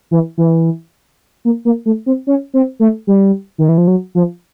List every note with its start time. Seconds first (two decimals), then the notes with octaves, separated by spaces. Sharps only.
0.11 E3
0.38 E3
1.45 A#3
1.65 A#3
1.86 A3
2.06 C4
2.27 C#4
2.54 C4
2.80 A3
3.07 G3
3.58 D#3
3.69 E3
3.78 F3
3.87 F#3
4.15 F3